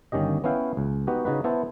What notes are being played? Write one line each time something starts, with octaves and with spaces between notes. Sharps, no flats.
G1 D#3 C#4 G4 D#5
B3 C#4 E4 F5 G5
C#2
B3 D#4 F#4 G4
C#3 D#4 F#4 B4
B3 E4 C5 A5